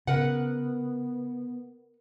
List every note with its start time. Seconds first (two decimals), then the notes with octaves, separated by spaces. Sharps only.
0.07 C#3 B3 A#4 B4 F#5